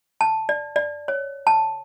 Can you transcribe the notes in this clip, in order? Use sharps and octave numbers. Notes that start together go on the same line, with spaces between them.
A5
D5
D5
C#5
A5